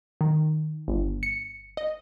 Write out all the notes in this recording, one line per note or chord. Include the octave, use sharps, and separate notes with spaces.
D#3
G1
C#7
D#5